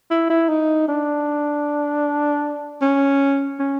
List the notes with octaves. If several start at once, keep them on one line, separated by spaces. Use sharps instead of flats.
E4
E4
D#4
D4
C#4
C#4